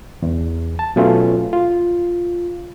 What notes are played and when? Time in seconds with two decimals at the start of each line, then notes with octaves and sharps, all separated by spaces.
0.22 E2
0.79 A5
0.96 B2 F#3 A3 C#4 F4
1.53 F4